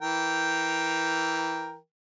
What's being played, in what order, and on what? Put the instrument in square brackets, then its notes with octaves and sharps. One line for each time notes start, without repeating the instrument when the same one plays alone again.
[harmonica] E3 A#4 G5